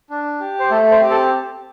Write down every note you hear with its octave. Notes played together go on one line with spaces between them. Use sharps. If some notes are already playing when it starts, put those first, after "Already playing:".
D4
G4
C5
A3 A4
C5
C4 G4
A4